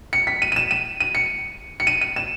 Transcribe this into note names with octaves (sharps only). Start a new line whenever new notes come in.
C#7
B6
D#7
D#7
E7
D#7
D#7
C#7
C#7
D#7
D#7
E7